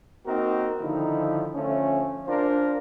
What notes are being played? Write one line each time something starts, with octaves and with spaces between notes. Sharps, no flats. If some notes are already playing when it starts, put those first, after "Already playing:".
A#3 C4 D#4 F#4 A#4
D3 D#3 F3 D#4 E4
D3 F3 A3 C#4
D4 F4 A#4 C5